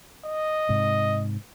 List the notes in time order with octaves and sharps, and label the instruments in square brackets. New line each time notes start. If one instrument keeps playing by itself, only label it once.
[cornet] D#5
[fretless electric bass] G#2 C3